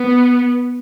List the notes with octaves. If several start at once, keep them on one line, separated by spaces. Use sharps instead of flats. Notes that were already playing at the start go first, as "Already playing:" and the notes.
Already playing: B3